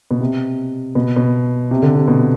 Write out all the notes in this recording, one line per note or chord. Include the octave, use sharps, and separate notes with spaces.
B2
C3
B2
B2
C3
D3
C3
B2